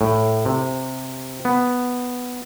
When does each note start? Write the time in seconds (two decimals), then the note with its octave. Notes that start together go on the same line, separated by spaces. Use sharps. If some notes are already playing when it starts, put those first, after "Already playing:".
0.01 A2
0.46 C3
1.45 B3